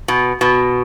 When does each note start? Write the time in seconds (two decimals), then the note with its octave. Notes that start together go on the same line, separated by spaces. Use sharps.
0.08 B2
0.41 B2